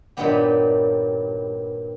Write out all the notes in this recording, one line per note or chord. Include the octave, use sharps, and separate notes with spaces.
G2 A#2 D#3 F#3 B3 G4